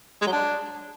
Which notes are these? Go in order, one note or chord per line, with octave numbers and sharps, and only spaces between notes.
G#3
F#3
D4